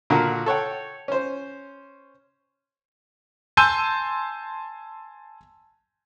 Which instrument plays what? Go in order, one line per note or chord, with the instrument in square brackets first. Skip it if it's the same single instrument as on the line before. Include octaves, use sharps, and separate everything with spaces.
[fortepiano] A#2 D3 F#4 A#4
A4 C#5 F#5 G5
C#4 C5
[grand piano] G#5 A5 C6 E6 G6 D#7